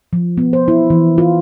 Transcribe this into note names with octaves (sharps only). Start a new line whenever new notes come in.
F3
B3
C5
E4
E3
F4